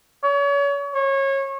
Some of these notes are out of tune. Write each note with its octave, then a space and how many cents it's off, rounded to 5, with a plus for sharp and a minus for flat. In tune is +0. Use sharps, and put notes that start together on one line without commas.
C#5 +35
C#5 -25